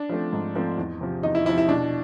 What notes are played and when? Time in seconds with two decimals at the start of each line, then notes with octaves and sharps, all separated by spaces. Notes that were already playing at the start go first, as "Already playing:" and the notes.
Already playing: D4
0.09 F3 A3 C4
0.33 G#2
0.55 F3 A3 C4
0.78 E2
1.01 C3 F3
1.23 E2 D#4
1.35 E4
1.46 C3 E4
1.49 F3
1.58 E4
1.68 B2 D4